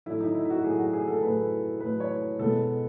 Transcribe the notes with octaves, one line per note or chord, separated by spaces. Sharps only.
A2 F#3 A3 E4
D#4
E4
E4
F#4
A2 F#3 A3 G#4
F#4
G#4
A4
A2 F#3 A3 B4
A2 F#3 A3 B4
C#5
B2 G#3 B3 A4